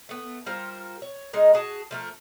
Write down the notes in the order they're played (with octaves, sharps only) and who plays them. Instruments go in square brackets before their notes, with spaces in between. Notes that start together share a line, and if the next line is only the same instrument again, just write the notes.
[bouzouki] A3 B3
G3 F4 A#4 C5
C#5
G#3 D#4 A#4
F#4 G#4 A5
F3 A3 A#4